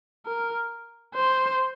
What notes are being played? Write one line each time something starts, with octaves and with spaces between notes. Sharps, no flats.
A#4
C5